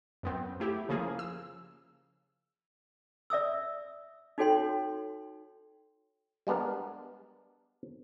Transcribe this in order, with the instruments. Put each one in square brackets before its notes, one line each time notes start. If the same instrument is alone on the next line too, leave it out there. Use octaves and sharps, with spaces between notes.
[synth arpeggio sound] F#2 B3 C4
A3 E4 G4
C#3 F3 A#3 G#4
E6
[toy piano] D5 E5 D#6 E6
D#4 F#4 A4 C#5 G5 C6
[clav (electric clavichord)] G3 G#3 B3 D4 A#4